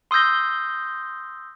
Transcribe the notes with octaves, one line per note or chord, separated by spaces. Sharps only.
C6 D#6 E6 G6 A#6